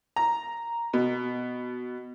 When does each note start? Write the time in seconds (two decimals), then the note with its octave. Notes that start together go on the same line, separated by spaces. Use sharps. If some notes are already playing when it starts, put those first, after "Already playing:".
0.16 A#5
0.93 B2